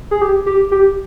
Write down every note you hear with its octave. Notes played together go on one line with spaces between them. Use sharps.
G#4
G4
G4
G4